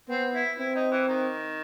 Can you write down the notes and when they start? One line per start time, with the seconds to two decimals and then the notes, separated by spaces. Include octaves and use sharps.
0.09 B3 C4
0.34 E4
0.59 C4 E4
0.75 D#4
0.91 E3
1.08 D#3